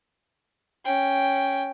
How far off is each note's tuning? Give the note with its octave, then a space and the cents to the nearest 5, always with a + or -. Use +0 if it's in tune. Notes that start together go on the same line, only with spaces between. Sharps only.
C#4 +0 G5 +0